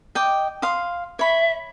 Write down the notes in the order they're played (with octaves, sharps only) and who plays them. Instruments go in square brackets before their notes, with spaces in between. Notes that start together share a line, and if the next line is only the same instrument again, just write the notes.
[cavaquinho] D#5 G5 D6
F5 C6 D#6
[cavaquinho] C#5 B5 [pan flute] E5